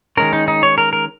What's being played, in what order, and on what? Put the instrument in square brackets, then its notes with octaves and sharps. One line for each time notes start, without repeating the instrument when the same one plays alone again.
[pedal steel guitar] D#3 G#3 C#4 A#4
D#4
D#4
C#5
A#4
A#4